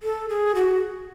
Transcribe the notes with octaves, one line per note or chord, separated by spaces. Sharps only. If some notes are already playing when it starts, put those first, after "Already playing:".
A4
G#4
F#4